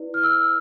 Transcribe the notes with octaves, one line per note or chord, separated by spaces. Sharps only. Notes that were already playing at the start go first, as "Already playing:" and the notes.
Already playing: E4 B4 D5
F6
E6